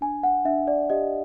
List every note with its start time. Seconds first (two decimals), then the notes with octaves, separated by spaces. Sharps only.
0.01 D4 G#5
0.23 F#5
0.45 D4 E5
0.68 D5
0.90 G4 D#5